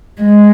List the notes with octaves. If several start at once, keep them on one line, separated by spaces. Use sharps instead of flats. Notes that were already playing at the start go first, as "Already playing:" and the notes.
G#3